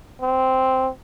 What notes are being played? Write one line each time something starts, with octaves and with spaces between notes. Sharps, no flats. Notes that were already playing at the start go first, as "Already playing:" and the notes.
C4